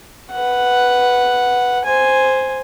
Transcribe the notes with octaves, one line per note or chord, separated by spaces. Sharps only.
B4 F#5
C5 G#5